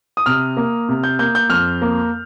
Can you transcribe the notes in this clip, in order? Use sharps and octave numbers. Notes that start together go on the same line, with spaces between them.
D#6
C3 F6
A#3
C3
G6
A#3 G6
G6
F2 F6
A#3